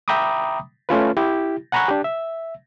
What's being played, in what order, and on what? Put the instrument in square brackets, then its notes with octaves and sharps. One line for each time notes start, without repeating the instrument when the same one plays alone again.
[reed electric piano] E5 G5 A#5 B5 D6 D#6
A3 C#4 F4 B4
E4 G4
F#5 G#5 A#5 B5 C#6 F#6
D4 G4
E5